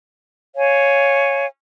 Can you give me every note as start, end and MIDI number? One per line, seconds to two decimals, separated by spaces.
0.56 1.46 73
0.56 1.46 77
0.56 1.46 80